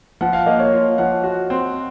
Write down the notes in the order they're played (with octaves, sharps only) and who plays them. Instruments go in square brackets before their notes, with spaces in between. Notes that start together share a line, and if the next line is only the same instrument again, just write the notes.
[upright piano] F3 [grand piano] F#5
[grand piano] F5
[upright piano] A#3 [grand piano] D#5
[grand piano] C#5
[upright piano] F4
[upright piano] F3 [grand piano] F#5
[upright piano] F#4
C4